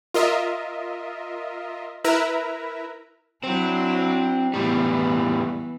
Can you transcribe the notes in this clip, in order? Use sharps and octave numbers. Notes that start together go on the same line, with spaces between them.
F4 A#4 D#5 E5
E4 A#4 B4 E5 A#5
F#3 C4 D4 E4
A2 E3 G3 B3